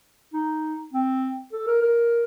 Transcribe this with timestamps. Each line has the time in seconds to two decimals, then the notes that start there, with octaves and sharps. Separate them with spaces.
0.34 D#4
0.93 C4
1.52 A4
1.67 A#4
1.82 A#4